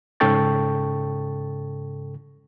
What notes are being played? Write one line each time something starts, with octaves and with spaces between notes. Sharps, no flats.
G#2 C#3 A4 G5 C#6 A6